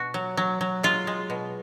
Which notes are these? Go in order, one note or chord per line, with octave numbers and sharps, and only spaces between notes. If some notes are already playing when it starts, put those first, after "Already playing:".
Already playing: B2 F#4
F#3
F#3
F#3
G#3 F4
G#3
B2